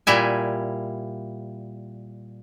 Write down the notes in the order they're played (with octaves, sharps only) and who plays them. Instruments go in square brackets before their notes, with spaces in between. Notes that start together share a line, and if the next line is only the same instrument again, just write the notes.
[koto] A#2 G3 E4 G#5